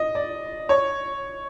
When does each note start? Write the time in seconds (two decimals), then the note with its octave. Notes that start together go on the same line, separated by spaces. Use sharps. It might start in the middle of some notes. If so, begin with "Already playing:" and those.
Already playing: D#5
0.15 D5
0.69 C#5